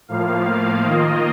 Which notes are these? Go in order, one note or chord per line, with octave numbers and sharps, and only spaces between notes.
A2 F3 A#3 F5
D#3 A#3 F4 D#5